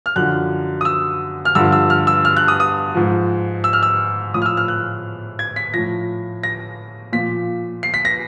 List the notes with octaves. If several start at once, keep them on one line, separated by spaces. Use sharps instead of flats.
F6
F#2 D3 F3 F#6
D#6
E6
F6
G2 D3 F3 E6
E6
F6
E6
F6
F#6
D#6
D#6
G#2 F3
E6
F6
E6
A2 F3 D#6
F6
E6
F6
F#6
G#6
B6
A2 F3 A#6
A#6
A#2 F3 B6
C7
B6
A#6